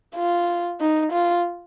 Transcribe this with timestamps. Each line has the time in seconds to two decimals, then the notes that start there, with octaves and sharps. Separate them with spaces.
0.16 F4
0.81 D#4
1.12 F4